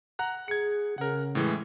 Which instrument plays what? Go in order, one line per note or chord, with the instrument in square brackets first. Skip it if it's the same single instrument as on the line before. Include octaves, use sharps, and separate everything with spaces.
[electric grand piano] F#5 A#5 F#6
[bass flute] G#4 [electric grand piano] G#6 C#7
[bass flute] C#3 [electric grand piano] A#4 F#5
[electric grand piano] A2 E3 G#3